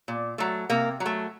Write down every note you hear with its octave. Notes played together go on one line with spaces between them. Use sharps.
A#2
F#3 A3
C3 A#3
F#3
A3